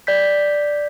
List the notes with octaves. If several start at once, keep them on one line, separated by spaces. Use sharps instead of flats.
D5 G6 B6